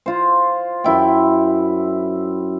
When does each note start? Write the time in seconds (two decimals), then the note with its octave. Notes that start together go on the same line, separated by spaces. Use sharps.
0.06 F4 C5
0.84 F#2 E4 G5